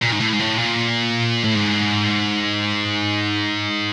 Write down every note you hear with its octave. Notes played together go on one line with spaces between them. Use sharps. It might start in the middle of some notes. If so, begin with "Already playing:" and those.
A#2
G#2
A2
G#2
A2
A#2
A2
G#2